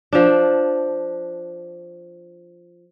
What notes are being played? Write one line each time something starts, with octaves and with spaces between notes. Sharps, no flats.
F3 D4